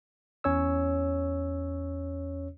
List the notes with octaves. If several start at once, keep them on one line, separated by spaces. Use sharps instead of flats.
E2 C#4 C#5 E6